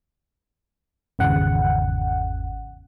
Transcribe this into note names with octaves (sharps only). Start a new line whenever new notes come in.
G#1 E2 C#3 F#5